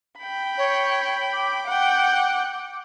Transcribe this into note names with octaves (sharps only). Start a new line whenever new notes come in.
G5 B5
C#5
D6
F#5 G5